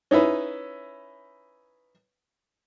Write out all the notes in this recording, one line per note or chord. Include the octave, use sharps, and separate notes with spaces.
C#4 D#4 E4 B4